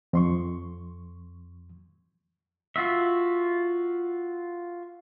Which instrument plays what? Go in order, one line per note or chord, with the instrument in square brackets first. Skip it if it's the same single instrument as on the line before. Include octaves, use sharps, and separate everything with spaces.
[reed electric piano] F2 C6 C#6
[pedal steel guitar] F4 F#4 E5